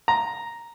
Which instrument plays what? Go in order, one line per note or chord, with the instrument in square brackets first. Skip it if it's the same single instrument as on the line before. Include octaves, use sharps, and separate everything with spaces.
[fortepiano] A#5